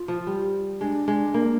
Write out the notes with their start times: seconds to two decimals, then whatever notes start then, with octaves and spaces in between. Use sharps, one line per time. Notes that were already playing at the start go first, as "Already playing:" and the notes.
Already playing: F4
0.08 F3
0.27 G3
0.80 G#3 D4
1.08 G#3
1.34 A#3